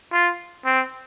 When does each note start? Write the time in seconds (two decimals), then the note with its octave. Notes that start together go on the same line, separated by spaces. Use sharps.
0.13 F4
0.65 C4